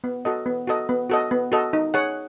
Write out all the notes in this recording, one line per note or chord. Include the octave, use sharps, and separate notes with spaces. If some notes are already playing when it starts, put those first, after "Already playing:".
B3
F#4 A4 D#5
B3
F#4 A4 D#5
B3
F#4 A4 D#5
B3
F#4 A4 D#5
D#4
G#4 C#5 F#5